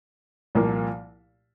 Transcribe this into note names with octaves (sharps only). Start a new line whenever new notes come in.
C2 A#2 F3 A#3